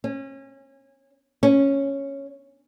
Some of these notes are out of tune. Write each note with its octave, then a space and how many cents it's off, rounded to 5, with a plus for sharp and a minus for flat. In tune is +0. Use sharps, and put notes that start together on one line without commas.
C#4 -30
C#4 -5